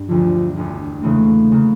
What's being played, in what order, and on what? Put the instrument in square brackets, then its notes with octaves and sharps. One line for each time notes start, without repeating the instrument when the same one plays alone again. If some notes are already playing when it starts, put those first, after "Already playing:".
Already playing: [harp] G2
[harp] E1 D2 D3 [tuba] F3
[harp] E1 D2 D3
[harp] E1 E2 C#3 E3 A#3 [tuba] A3
[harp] C#3 E3 A#3